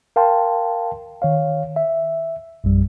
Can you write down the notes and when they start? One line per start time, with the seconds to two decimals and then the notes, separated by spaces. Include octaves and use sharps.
0.16 A#4 F5 G5 A5 C6
1.22 D#3 C#5 F5
1.76 E5
2.64 A#1 F#2 G3